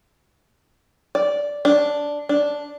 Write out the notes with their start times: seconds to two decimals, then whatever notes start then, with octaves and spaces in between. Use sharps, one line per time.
1.15 D5
1.65 D4
2.29 D4